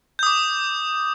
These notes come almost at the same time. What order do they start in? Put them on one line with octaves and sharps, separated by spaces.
G6 D#6 D6